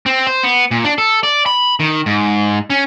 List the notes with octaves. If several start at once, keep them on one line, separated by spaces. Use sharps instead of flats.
C4
C5
B3
A#2
D4
A4
D5
B5
D#3
G#2
C#4